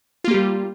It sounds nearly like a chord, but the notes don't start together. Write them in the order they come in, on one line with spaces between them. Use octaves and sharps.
F4 A#3 G4 G3